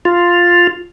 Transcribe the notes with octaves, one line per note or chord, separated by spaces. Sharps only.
F4